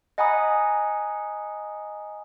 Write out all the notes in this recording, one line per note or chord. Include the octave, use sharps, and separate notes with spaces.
D#5 F#5 G#5 A#5 B5 D#6